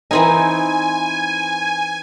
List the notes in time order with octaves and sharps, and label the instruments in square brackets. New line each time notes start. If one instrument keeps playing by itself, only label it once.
[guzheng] E3 C4 D#4 [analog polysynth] G#5